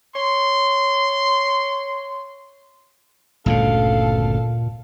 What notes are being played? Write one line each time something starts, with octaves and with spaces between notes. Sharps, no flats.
C#5 C6
G1 D2 A#2 C#3 A4 F5